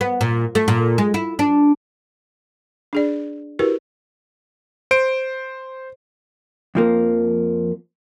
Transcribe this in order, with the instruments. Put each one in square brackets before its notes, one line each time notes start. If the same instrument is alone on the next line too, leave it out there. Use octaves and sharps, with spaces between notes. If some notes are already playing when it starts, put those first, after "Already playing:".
[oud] B3
A#2
A3
A#2
G#3
E4
D4
[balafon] D4 G#4 D5
E4 F#4 G4 A#4 B4
[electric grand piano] C5 D7
[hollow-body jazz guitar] F2 F3 A#3